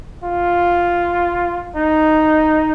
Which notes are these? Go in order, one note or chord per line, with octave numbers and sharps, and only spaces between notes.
F4
D#4